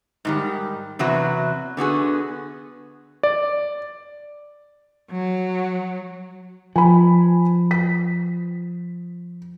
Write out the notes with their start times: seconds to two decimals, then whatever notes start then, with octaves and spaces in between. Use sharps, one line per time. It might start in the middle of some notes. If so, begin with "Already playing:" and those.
0.25 G#2 D#3 G3
0.99 E2 C3 F#3 F#4 B4
1.77 D3 B3 F#4 G#4
3.23 D5
5.11 F#3
6.76 F3 G#5 B5
7.71 B6